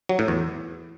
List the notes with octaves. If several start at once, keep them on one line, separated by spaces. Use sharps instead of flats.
F#3
A2
E2